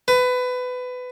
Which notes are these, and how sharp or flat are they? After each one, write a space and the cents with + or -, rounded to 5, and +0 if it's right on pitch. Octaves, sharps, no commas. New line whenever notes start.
B4 +20